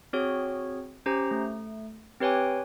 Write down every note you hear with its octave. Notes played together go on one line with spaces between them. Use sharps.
C4 F#4 G#4 C#5
C#4 G4 C5 A#5
A3
C4 G4 B4 C#5 G5 G#5